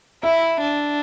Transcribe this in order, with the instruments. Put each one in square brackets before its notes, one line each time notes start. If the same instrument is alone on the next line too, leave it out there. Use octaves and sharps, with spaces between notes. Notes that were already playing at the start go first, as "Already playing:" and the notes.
[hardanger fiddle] E4 [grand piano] E5
[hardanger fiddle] D4